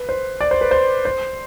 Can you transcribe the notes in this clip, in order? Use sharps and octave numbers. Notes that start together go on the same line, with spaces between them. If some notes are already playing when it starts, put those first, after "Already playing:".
Already playing: B4
C5
D5
C5
B4
C5
C5